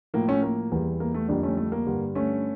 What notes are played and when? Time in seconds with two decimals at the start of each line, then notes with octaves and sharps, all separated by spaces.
0.14 A2 F3 A#3
0.28 A3 C#4
0.42 A#3
0.71 E2 E3 G3
1.00 A#3
1.14 A3
1.28 F2 D3 G3 A#3 D4
1.43 A3 C#4
1.57 A3
1.72 A#3
1.86 G2 D3 G3
2.15 A3 C#4